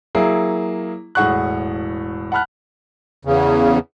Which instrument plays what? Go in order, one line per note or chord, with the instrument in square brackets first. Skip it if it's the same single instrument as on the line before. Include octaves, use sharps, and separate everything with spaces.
[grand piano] F#3 A#3 E4 G#4
E1 A2 G#4 F#5 C#6 F#6
F#5 A5 B5 F6 F#6
[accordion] E2 C#3